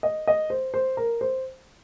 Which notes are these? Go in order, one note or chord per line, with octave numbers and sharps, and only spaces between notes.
D#5
D#5
C5
C5
A#4
C5